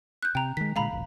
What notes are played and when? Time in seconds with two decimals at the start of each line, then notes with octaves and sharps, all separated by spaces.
0.23 F#6 G6
0.35 C3 G5 A#5
0.57 D#3 G#3 B6
0.76 A#2 D3 G#3 F5 A#5 B5
0.91 E1 A#1